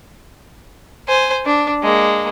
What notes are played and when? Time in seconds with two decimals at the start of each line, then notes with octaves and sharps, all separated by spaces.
1.08 C5 G#5
1.46 D4
1.83 G#3 A#3